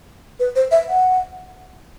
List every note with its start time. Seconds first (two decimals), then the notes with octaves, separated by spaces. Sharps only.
0.40 B4
0.56 C5
0.71 E5
0.88 F#5